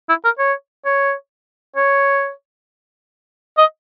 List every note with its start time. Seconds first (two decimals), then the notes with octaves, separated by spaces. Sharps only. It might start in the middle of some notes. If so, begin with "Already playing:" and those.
0.09 E4
0.25 A#4
0.39 C#5
0.85 C#5
1.76 C#5
3.58 D#5